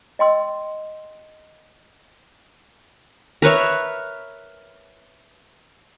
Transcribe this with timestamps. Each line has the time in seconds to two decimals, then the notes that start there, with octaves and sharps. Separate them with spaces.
0.19 D#5 G5 C6 E6
3.42 A#4 B4 C#5 E5